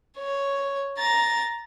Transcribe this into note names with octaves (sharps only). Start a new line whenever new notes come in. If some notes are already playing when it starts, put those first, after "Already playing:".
C#5
A#5 A6